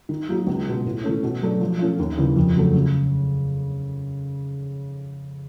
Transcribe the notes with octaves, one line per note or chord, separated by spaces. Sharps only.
D#3
F#3 A#3 D#4 F#4
C#2
B2 G#3
A2
E3 A3 C#4
B2
F#3 A3 D4
F3
A3 C#4 F4
D#2
C#3 E3 G3
F2
C#3 F#3 A3
C#3